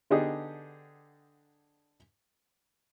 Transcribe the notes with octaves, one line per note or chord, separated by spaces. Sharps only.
D3 B3 D4 D#4 G4 G#4